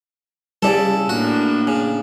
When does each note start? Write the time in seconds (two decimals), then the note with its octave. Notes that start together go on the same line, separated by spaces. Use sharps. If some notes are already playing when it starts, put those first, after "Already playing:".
0.63 C#3 G3 E4 A4 D5
1.09 A2 A#3 D4 F#4
1.67 C#3